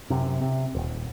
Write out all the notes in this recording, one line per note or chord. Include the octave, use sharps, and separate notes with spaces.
F#2 C3
C3
D#1